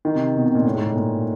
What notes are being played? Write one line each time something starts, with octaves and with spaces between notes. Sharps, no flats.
D#3
C3
B2
C3
A#2
A2
G#2
A2
A#2